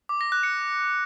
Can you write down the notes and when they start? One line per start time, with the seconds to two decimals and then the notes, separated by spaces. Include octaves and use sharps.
0.09 D6
0.21 A#6
0.32 F#6
0.43 C#7